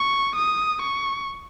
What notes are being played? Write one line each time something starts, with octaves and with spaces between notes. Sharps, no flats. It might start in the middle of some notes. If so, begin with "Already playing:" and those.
Already playing: C#6
D#6
C#6